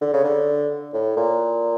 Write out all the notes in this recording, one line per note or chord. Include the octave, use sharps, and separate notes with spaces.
D3
C#3
D3
A2
A#2